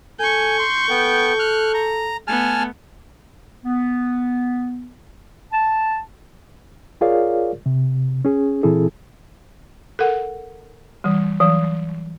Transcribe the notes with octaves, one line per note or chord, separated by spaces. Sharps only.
A4 G#5 C#6 G6
C6
B3 A4 G5
F6 F#6
A#5
A3 B3 G#5 A5 F6
B3
A5
F4 G#4 A#4 C#5 D5 F5
C3
C#4 G#4
A#2 E3 C4 E4 G#4 A4
A4 A#4 F#5
E3 G3
E3 F#3